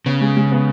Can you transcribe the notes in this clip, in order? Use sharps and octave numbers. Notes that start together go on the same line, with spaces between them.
C#3 B3
G#3
G#3
B3